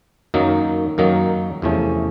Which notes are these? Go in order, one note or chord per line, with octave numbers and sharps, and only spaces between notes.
F#2 D#3 F#3 A#3 D#4
F#2 D#3 F#3 A#3 D#4
E2 C3 F3 A3 C#4